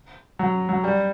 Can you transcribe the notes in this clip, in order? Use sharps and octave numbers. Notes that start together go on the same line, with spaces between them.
F#3
F#3
G3